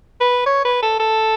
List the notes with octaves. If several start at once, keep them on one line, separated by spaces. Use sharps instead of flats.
B4
C#5
B4
A4
A4